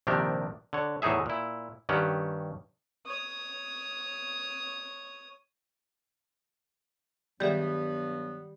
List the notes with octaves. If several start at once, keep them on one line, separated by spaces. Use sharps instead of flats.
A#1 C3 D#3 D4 G4 A#4
D3 C#5
E2 A2 E3 D#4 G#4 E5
A#2 E4
G2 D#3 C#4 G4 F#5
C#5 D#6
G2 D#3 F#3 G3 B3 G#4 E5